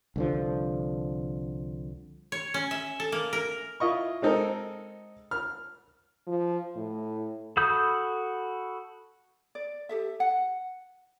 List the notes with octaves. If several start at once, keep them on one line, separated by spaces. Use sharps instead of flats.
C2 D3 F3
C#5
C#4
E5
A4
A#3
A#4
E4 F4 D#5 C#6
G#3 C4 D#4 A4 A#4
F6
F3
A2
F#4 A4 B5 D#6 G6
D5
G4 A4 E5
F#5